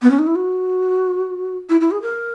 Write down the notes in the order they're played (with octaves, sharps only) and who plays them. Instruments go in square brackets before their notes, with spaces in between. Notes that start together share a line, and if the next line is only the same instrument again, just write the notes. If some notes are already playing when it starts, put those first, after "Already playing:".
[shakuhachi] B3
C#4
D#4
E4
F#4
E4
E4
G#4
A#4